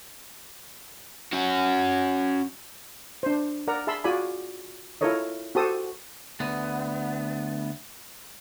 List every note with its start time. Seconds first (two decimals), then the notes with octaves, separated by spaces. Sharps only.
1.33 C#4 F#4
3.23 D4 C5
3.68 A#4 D5 F#5 A#5
3.87 G#4 E5 A5 B5 C6 E6
4.04 F4 F#4 G#4 D5 G#5 B5
5.01 E4 F4 A4 A#4 C#5 D#5
5.55 F#4 G4 A4 C5 A5 D#6
6.40 D2 B3